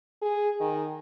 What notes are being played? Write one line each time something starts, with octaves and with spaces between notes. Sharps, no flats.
G#4
D#3